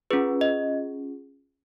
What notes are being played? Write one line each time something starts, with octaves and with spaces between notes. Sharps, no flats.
C#4 F4 G#4 B4
D#5